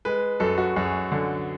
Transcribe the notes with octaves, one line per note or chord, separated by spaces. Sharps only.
G#3 B4
F#2 A4
F#4
F#2 G#4
D3